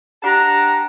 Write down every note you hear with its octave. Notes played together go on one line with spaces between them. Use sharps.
D4 G4 F#5 A5 A#5